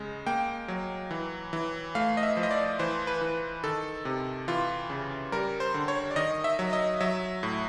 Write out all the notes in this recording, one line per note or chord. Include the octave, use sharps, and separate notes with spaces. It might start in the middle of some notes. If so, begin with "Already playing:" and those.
Already playing: C#3 G#3
A#3 G5
F#3
E3
E3
A3 F5
D#5
E5
F3
D#5
D5
E3 C5
B4
E3
D#3 A4
C3
E3 F4
C#3
G3 A#4
C5
D3
C#5
D5
D#3 D#5
E5
F#3
D#5
F#3 E5
A2